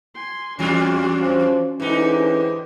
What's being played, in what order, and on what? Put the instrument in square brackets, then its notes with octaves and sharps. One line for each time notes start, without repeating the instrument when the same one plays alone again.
[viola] G#5 C6
[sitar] E2 G3 F4 [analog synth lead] C#4 [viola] D4 F#4
[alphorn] F3
[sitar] G#2 D#4 [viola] D3 G4 [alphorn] E3